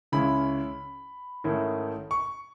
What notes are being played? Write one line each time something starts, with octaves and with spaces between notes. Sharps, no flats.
C#2 C#3 G#3 C#4 E4 B5
G#2 D#3 A3 C#4 E4
C#6